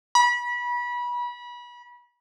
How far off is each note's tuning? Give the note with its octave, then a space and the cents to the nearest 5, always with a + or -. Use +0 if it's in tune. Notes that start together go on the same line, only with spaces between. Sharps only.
B5 -30